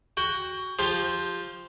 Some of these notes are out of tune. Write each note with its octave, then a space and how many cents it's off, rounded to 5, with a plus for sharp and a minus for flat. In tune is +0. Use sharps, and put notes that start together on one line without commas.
F#4 +15 G5 +20
F3 +0 G4 +20